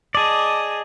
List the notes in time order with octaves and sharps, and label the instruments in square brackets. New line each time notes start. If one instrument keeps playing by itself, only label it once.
[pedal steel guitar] G#4 D5 [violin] D#5 A5